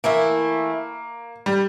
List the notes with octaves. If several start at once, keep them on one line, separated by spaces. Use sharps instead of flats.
E3 A3 A#3 E4
G3